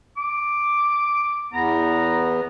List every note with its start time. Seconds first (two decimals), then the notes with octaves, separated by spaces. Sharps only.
0.17 D6
1.53 E2 B3 A#5